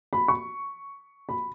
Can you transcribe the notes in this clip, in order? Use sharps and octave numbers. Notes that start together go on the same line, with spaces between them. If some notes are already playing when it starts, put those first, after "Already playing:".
B5
C#6
B5